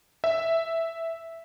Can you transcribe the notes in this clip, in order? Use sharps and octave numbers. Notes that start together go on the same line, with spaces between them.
E5